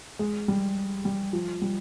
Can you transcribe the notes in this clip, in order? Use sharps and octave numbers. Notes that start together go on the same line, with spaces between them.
G#3
G3
G3
F3
G3